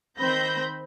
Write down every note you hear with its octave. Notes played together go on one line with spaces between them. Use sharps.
D#3 C4 C5 B5 G6 A#6